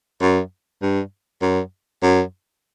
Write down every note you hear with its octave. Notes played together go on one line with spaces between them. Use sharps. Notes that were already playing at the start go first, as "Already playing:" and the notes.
F#2
G2
F#2
F#2